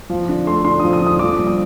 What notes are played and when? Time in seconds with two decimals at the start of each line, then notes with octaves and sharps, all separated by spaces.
0.10 F3
0.29 D3
0.47 A3 C6
0.64 D3 C6
0.79 F3 D#6
0.93 D#6
1.01 D3
1.07 D#6
1.19 F3 D6
1.39 G2
1.47 D#6